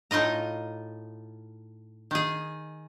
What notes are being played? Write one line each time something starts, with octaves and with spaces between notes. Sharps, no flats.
A2 D#4 F4 D#5 A#5
D#3 G#4